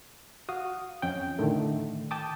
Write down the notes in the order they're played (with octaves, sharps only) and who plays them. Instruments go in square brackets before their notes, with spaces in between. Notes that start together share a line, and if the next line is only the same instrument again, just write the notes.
[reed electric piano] F#4 F5 D#6
F2 C#4 G5
A2 D3 D#3 A3
G5 A5 D6 D#6